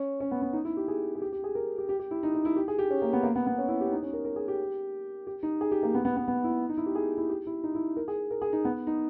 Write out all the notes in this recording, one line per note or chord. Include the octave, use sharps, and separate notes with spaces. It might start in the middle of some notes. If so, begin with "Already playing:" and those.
Already playing: C#4
C#4
B3
B3
D#4
E4
G4
G#4
G#4
G4
G4
G#4
A#4
G4
G4
G4
E4
D#4
D#4
E4
G4
G#4
G4
C#4
A#3
B3
A#3
B3
B3
C#4
E4
G4
D#4
C#4
A#4
A#4
G#4
G4
G4
D#4
G#4
G4
A#3
B3
B3
B3
B3
E4
D#4
E4
G4
G#4
E4
G4
E4
D#4
E4
A#4
G#4
A#4
G#4
D#4
B3
D#4